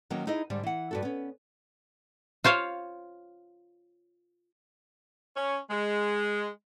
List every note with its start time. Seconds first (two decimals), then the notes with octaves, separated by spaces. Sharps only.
0.10 D#3 F#3 A#3 C#4
0.27 D#4 E4 G#4 D#5
0.50 G#2 D3 G3
0.63 E3 F#5
0.91 G2 F#4 A4
1.02 B3 C#4
2.44 F4 C5 C#5 F5
5.35 C#4
5.69 G#3